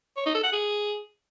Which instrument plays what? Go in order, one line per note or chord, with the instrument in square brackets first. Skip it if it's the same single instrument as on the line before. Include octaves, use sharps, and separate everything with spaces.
[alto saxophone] C#5
D#4
A4
F#5
G#4